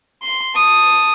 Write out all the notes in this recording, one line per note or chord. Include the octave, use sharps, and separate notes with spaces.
C6
A5 D#6